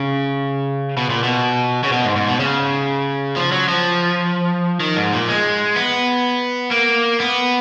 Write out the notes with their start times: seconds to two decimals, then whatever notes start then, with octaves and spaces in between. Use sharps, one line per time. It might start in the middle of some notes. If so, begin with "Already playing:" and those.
Already playing: C#3
0.97 B2
1.10 A#2
1.23 B2
1.83 C#3
1.92 B2
2.04 G#2
2.16 G#2
2.28 B2
2.40 C#3
3.36 F3
3.52 F#3
3.68 F3
4.80 D#3
4.96 G#2
5.13 A#2
5.29 G#3
5.76 B3
6.71 A#3
7.20 B3